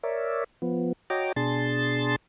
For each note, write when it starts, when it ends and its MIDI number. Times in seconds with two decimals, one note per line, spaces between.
0.03 0.44 70
0.03 0.44 73
0.03 0.44 74
0.03 0.44 76
0.62 0.93 53
0.62 0.93 59
1.10 1.32 66
1.10 1.32 73
1.10 1.32 75
1.10 1.32 79
1.10 1.32 82
1.10 1.32 86
1.36 2.16 47
1.36 2.16 62
1.36 2.16 68
1.36 2.16 81
1.36 2.16 84
1.36 2.16 93